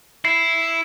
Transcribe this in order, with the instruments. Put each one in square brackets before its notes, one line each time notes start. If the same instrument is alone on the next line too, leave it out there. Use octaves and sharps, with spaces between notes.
[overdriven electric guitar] E4 [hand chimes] C7